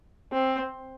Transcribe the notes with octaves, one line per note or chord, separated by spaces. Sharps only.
C4